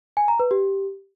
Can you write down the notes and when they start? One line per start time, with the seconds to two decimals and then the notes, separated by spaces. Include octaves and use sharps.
0.17 G#5
0.28 A#5
0.40 B4
0.51 G4